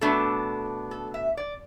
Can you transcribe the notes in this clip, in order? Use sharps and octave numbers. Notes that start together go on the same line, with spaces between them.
B2 A3 D4 A4
A4
E5
D5